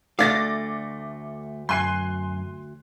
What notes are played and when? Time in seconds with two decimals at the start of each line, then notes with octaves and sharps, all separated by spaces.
0.19 D2 A3 D4 F5 D6 A6 A#6
1.69 F#2 G#5 C6 F#6 C7